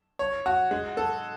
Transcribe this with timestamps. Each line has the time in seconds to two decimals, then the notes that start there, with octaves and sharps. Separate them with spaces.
0.19 C#5
0.46 F#4
0.71 G#3
0.97 A4